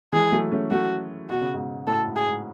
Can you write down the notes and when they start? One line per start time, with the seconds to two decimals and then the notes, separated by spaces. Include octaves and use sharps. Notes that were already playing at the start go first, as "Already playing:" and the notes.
0.13 E3 G#3 G#4
0.32 F#3 A3
0.52 A3 C#4
0.71 F#3 A3 F#4
1.30 B2 F#4
1.41 C#3
1.54 G#2 B2
1.87 A2 A4
2.07 G#2
2.16 G#4
2.26 G#2